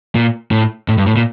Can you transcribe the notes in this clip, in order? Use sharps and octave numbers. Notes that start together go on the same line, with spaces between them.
A#2
A2
A2
G2
A2
A#2